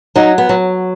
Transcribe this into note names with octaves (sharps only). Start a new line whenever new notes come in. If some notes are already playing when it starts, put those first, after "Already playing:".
F#3 D#4
B3
F#3